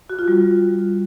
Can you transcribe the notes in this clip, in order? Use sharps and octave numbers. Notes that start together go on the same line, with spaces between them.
F#4
F4
G3